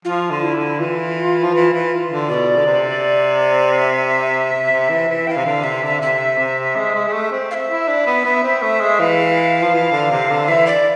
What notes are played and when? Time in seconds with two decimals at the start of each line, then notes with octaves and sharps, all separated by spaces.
0.05 F3 F4
0.30 D3
0.43 E4
0.55 D3
0.79 E3 F4
1.43 F3
1.54 E3
1.73 E3
2.10 D3
2.28 B2 D5
2.57 D3
2.66 C3
3.78 E5
4.53 C3
4.71 C3
4.89 E3
5.08 E3
5.27 E3 F5 G5
5.37 C3
5.45 D3
5.64 C3 E5
5.83 D3
6.01 C3 E5
6.38 C3
6.76 G#3
6.94 G#3
7.08 G#3
7.13 A3
7.32 C4
7.51 F5
7.54 E5
7.69 E4
7.88 D4
8.06 B3
8.25 B3
8.43 C4
8.62 A3
8.80 G#3
8.99 E3 F5
9.62 F3
9.74 E3
9.92 D3
10.11 C3
10.30 D3
10.48 E3 E5
10.67 D5